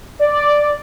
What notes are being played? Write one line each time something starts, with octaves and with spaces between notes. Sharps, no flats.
D5